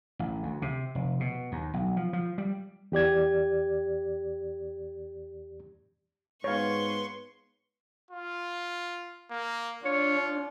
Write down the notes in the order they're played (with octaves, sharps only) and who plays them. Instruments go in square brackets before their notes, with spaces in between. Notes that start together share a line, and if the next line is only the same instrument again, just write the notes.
[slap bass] A1
D2
C3
F1
B2
D#2
B1
F3
F3
G3
[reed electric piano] E2 G4 D5 G#6
[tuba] G#2 [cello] B3 B4 [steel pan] C#5 F5 [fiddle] C6 C#6
[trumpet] F4
A#3
[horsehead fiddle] D4 [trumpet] F4 [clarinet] C#5